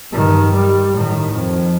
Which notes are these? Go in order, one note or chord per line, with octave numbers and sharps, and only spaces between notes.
G2 D#3
G3
A2 D#3
F2